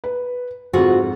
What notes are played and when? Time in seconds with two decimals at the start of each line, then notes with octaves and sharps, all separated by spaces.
0.04 B4
0.73 F2 G#2 C4 F4 F#4